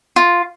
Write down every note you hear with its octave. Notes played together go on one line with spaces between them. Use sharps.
F4